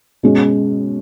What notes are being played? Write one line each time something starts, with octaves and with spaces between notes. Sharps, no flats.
B2 G#3 C#4